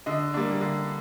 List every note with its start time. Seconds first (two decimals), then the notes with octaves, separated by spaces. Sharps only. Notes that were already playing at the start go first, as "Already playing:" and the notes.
0.06 D3 D#5
0.34 G3 A#3 D4
0.61 D3